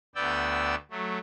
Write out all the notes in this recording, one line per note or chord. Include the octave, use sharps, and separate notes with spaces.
D2 B3 D5 G5 E6
F#3 A3